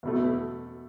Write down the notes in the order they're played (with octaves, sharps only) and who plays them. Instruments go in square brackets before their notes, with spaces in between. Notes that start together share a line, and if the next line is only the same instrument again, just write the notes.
[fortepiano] E2 B2 A3